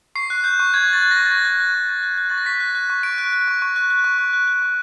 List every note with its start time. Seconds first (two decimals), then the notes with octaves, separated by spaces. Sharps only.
0.15 C#6 C7
0.30 F#6
0.44 F#6 G6
0.60 C#6
0.74 C#6 G#6
0.88 F#6
0.93 A6
1.02 F#6
1.11 A#6
1.17 C#6
1.26 A6
1.31 C#6 A#6
1.45 F#6
1.60 F#6
1.74 C#6
1.89 C#6
2.03 F#6
2.18 F#6
2.30 C#6 A6
2.38 A#6
2.46 C#6 B6
2.60 F#6
2.75 F#6
2.90 C#6
3.03 C#6 D7
3.18 F#6
3.33 F#6
3.48 C#6
3.62 C#6
3.76 F#6
3.90 F#6
4.04 C#6
4.18 C#6
4.33 F#6
4.48 F#6
4.62 C#6